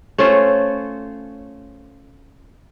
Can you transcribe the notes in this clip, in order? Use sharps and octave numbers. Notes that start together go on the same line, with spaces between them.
A3 C#4 F4 C5